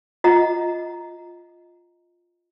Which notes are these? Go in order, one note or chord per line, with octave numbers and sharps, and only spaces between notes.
F4 D#5 F#5 A#5